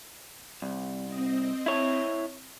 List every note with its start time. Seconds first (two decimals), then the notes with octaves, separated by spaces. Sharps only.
0.62 C2
1.05 C4 D#5
1.66 E4 C#5